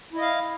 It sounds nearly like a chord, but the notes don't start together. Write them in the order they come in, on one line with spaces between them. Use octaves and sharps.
E4 D#5 F5